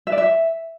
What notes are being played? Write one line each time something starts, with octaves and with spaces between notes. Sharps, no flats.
E5
D5
E5